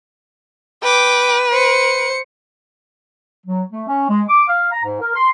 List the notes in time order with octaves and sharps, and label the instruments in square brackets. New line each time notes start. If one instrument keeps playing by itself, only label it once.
[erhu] B4 [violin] G5 D6
[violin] C5 C#7
[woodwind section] F#3
A3
C#4
G#3
D6
F5
A#5
G#2
A#4
C6